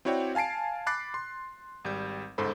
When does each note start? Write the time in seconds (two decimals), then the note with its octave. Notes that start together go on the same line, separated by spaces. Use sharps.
0.05 C4 E4 F#4 C#5 D5 G5
0.35 F5 G#5 A5 C7 D7
0.87 B5 D6 F#6 A6 C7
1.14 C6
1.85 G#1 G3 G6
2.38 G1 C#2 G#2 A4 C5 B5